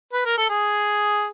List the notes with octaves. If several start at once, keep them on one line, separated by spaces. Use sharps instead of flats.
B4
A#4
A4
G#4